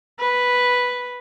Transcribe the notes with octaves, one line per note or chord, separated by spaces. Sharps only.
B4